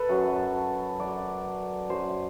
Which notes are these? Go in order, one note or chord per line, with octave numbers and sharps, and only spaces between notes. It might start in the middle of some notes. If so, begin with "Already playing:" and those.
Already playing: A4 B4
F#2 F#3
F#2 F#3 D5
F#2 F#3 C5